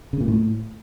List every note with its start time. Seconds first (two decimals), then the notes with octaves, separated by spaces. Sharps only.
0.13 C#3
0.20 A#2
0.28 A2